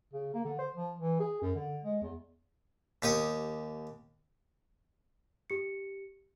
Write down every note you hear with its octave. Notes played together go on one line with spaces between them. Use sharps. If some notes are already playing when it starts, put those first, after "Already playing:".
C#3
A#3
D3
C5
F3
E3
G#4
F#2
D3
G#3
E2
D#2 G4 C#6 D#6
G4 C#7